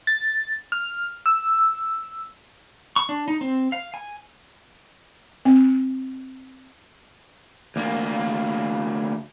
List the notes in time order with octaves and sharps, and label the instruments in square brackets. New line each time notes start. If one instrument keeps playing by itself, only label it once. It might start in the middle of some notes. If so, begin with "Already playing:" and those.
[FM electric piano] A6
F6
E6
[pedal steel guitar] C#6
D4
D#4
C4
F5
G#5
[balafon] C4
[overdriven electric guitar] D2 A#3